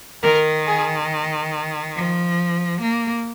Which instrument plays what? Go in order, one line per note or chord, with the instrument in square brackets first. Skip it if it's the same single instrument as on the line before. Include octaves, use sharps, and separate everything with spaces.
[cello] D#3 [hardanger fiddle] A#4
[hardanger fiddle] G#4
[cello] F3
A#3